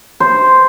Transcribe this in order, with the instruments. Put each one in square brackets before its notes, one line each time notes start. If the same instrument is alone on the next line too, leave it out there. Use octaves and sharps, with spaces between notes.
[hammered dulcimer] C5